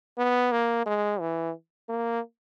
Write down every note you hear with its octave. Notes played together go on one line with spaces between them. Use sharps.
B3
A#3
G#3
E3
A#3